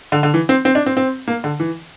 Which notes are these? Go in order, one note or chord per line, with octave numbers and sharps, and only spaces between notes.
D3
D3
E3
C4
C4
D4
C4
C4
A#3
D3
E3